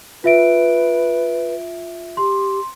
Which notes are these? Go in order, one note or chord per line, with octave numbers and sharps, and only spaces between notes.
F4 B4 E5 D7
G4 C6